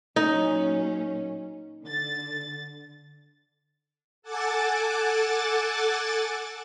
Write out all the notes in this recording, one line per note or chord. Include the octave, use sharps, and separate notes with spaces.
A#2 F#3 C#4 D#4
D3 A6
A4 F#5 G#5 A5 D6 A6